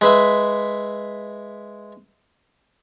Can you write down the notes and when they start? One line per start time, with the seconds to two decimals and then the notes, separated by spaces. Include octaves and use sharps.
0.01 G#3 B4 E5